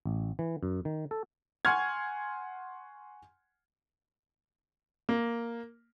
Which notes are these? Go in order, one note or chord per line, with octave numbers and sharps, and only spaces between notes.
A1
E3
F#2
D#3
A4
F#5 G#5 C6 C#6 F6 G#6
A#3